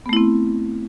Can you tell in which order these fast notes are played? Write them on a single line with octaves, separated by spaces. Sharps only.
B3 A3 E4 C4